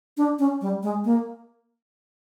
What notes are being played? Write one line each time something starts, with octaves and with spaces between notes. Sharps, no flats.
D4
C#4
G3
G#3
A#3